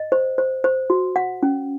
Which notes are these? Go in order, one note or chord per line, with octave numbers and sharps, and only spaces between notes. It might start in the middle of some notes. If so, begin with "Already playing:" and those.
Already playing: D#5
C5
C5
C5
F#4
F#5
C#4